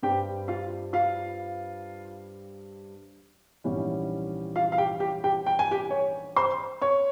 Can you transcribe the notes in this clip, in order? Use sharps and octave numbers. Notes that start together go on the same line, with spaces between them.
G2 G3 C4 G4 G5
F4 F5
F4 F5
A#1 G#2 E3 G3 C#4
F4 F5
F5
G4 G5
G4 G5
G4 G5
G5
G#5
G4 G5
C#5
C5 C6
C#5 C#6